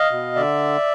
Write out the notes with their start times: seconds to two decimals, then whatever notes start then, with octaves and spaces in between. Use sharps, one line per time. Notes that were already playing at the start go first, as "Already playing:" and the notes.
Already playing: D#5 F5
0.11 B2
0.36 D3 D5 E5